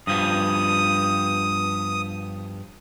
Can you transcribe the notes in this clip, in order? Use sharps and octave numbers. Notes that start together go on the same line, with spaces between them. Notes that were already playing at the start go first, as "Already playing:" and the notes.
G2 F3 B3 D#6